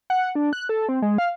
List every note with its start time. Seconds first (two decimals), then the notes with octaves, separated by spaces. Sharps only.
0.10 F#5
0.35 D4
0.53 F#6
0.69 A4
0.89 C4
1.02 G#3
1.18 F5